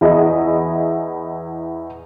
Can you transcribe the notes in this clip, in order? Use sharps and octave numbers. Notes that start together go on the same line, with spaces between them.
E2 E4 D#5